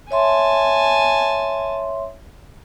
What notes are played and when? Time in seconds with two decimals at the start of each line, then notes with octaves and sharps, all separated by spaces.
0.11 C#5 E5 G#5 A5 C6